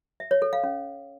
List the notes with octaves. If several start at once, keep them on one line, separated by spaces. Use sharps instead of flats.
E5
C#5
A4
F5
C#4